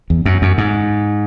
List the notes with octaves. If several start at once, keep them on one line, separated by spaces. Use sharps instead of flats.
E2
F#2
F#2
G#2